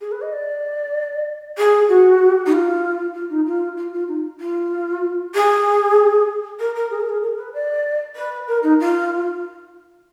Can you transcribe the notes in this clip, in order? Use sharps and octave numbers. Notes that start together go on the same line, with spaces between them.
G#4
B4
D#5
D5
G#4
F#4
D#4
F4
F4
D#4
F4
F4
F4
D#4
F4
G#4
A#4
A#4
G#4
A#4
G#4
A#4
B4
D5
B4
A#4
D#4
F4